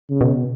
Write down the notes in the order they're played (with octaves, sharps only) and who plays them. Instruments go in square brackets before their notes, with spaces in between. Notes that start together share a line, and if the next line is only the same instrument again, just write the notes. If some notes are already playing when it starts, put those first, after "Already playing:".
[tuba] C#3
[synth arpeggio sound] B2